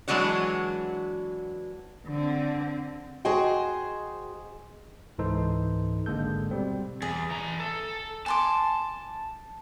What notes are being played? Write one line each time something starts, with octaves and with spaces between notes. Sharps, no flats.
E3 F#3 G#3 D4 F#4 C#5
D3 C4
F#4 G#4 C5 D#5 G5
C#2 G#2 E3 D#4 A4 C5
G#1 D3 G#3 A#3 A4 G6
B2 G3 C4
E2 G#4
E3 A#5
A4
G#5 A5 C6 D6